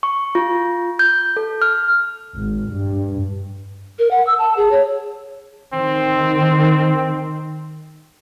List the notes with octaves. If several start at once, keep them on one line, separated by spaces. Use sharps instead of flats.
C#6
F4
G6
A4
F6
G#1
G2
A#4
F#5
E6
A5
G#4
C#5
D#3 C4